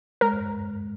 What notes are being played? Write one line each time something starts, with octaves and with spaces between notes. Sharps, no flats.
G#3 A#4